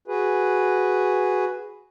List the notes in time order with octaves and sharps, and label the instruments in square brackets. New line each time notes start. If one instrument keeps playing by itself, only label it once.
[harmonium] F#4 G#4 B4